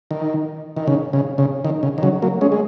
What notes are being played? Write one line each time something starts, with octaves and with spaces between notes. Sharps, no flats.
D#3
D#3
C#3
C#3
C#3
D#3
C#3
D#3
C#3 F#3
F#3 A#3
G#3 C#4
G#3